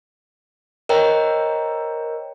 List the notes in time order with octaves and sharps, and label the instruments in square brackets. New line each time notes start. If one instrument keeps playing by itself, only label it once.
[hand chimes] A#4 C5 C#5 D#5 G5 A#5